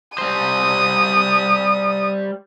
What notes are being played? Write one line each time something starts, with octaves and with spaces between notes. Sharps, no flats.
G3 C5 D#6